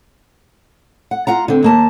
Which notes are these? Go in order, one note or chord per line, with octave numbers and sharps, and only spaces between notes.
F#5
F4 F#5 A#5
D3 C4
D#2 A#3 A5